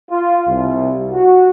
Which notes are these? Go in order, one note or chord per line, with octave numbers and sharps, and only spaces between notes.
F4
C2
F#4